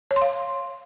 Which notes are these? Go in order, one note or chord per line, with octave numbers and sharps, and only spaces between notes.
C#5
C6
F5